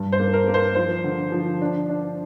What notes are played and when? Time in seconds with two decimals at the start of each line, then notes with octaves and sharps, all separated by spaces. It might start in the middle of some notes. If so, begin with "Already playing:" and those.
Already playing: G2
0.12 C5
0.19 A#3
0.33 A#4
0.48 A#3
0.54 C5
0.75 F3 C5
1.04 D3
1.32 F3
1.62 D4
1.89 D4